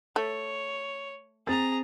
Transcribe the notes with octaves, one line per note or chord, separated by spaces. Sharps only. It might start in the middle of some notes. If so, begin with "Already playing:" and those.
A3 C#5
C4 G#4 A#5 A6